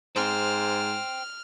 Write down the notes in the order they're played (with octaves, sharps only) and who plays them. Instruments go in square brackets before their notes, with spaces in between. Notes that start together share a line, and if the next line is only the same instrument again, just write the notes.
[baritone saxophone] G#2 [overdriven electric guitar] C5 G5 [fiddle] F6